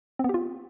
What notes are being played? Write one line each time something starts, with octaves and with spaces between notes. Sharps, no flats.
B3 C4 F4 G4